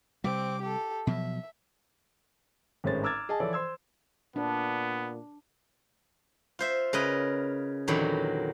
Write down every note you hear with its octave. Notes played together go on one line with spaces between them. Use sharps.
C3 G3 C4 D6
G4 A4
B2 F3 F#3 E5
G#1 A2 G#3 C#4 C5 A6
A#5 D6 E6 F6 G#6 A6
G#4 D#5 G#5 A5
E3 F3 A4 C#5 D5
C5 C6 E6 G#6
A#2 B3 D4
F4 C5 E5
C#3 A#4 B4 D#5
E2 A#2 D3 D#3 F#3 B5